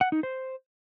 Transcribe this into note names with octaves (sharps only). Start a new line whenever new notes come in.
F#5
D#4
C5